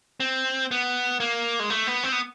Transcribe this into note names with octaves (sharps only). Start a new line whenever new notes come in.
C4
B3
A#3
G#3
A3
B3
C4
B3